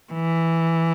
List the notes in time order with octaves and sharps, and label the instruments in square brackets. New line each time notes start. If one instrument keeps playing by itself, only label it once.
[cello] E3